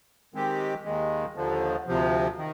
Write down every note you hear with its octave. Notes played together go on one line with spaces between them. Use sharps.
D#3 G#3 C4 G4
D#2 D#3 G#3
D#2 D3 F3
D2 C3 F3
D#3